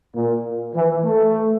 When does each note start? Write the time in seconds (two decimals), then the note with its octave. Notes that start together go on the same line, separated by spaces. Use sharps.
0.15 A#2
0.75 E3
1.04 A3